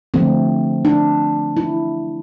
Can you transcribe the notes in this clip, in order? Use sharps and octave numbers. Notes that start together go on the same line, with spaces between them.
D3 F3 A3 C4
D4
E4